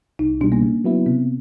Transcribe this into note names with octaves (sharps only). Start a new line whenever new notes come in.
C2 D#4
B2 G3 D4
A#3
C#3
F#3 B3 E4
C3 B3